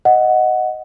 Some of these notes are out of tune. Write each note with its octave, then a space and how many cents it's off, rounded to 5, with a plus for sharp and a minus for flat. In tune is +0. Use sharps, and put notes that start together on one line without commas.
D#5 +5 F#5 +0